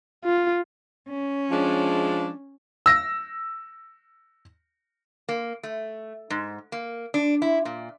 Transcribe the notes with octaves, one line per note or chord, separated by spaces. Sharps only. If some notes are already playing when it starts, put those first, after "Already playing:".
F4
C#4
F3 G#3 D4
E6 A#6
A#3
A3
G#2
A#3
D4
E4
A#2